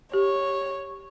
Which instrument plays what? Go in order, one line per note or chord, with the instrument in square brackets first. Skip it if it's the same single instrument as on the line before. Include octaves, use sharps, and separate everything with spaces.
[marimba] G4 [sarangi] C#5